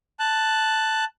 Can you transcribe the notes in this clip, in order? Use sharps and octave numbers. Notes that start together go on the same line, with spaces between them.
A5 F#6